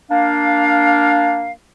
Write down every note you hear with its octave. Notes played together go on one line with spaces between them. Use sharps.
A#3 D4 F5